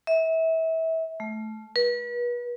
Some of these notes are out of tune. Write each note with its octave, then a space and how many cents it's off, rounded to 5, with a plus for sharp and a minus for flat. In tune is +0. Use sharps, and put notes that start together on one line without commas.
E5 -30
A3 -20
B4 -40